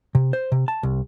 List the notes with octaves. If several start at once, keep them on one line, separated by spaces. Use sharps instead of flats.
C3
C5
C3
A5
C2